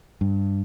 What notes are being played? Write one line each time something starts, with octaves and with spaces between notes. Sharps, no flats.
G2